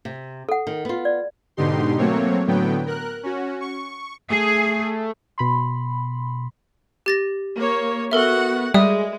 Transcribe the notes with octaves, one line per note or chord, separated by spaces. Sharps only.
C3
A4 F#5
D#3
B3 F4
D5
G#2 B2 D3 D#4 G4 C6
F#3 A3 A#3 C4 C#5
A2 D3 F#3 B3 G5
A#4 F#6
C#4 F#4
C#6
A3 G#4
B2 B5 C6
G4 A6 A#6
A#3 C#5
B3 F#4 A4 A#4 E5 F#5
G3 G#3 D5 E5 D#6